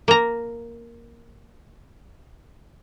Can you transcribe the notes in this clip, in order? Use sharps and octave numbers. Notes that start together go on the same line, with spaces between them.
A#3 A#5